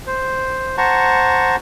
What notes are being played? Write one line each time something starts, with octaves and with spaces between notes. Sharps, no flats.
C5
C5 F#5 A5 A#5 C#6